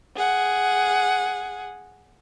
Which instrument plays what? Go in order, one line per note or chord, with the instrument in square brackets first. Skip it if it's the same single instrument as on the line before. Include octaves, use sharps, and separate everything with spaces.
[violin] G#4 F#5